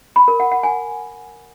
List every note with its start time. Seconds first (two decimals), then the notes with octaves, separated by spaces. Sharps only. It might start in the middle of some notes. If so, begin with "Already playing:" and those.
0.16 B5
0.28 A#4
0.40 F#5
0.51 F#5
0.63 G#5